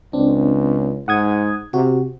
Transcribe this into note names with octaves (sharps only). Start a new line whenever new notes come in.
C#2 C4 D4
G#2 F#5 D#6 G#6
C3 F#4